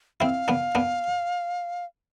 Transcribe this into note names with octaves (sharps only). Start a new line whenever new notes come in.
C4 E4 F5
B3 D4
B3 D4